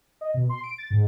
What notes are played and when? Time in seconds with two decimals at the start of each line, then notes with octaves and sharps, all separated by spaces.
0.21 D#5
0.34 B2
0.49 C6
0.63 D7
0.78 A6
0.90 G#2